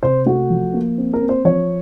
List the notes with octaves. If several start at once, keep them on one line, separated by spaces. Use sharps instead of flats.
C3 C5
A3 F#4
F3
A#3
C4
A#4
C4
C5
F3 C#5